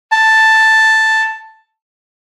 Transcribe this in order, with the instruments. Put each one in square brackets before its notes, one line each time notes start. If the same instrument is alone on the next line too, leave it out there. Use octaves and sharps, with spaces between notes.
[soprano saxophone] A5